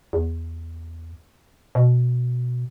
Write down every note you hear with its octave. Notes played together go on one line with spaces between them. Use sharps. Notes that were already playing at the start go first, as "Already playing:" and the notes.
E2
B2